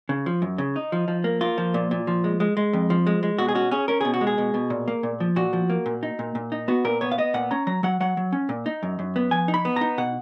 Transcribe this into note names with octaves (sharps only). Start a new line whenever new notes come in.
C#3
F3
F#2
C#3
D#4
F3
F3
A#3
A#3 F4
F3
A#2
A#2
F3
G#3
G#3
G#3
F2
F3
G#3
G#3
B2 F#4
G#4
C#4 F#4
C#4 G#4
C#4 A#4
B2 G#4
F#4
G#3
G#4
B2
B2
A#2
A#3
A#2
F3
A#2 F#4
F3
A#3
A#2
D#4
A#2
A#2
D#4
B3 F#4
A#2 A#4
B3 C#5
F5
B3 D#5
A#2 F#5
C#4 A#5
F#3 A#5
F#3 F#5
F#3 F#5
F#3
C#4
A#2
D#4
F#2
F#2
B3
F3 G#5
D#4
B5
B3
D#4 A#5
B2 F#5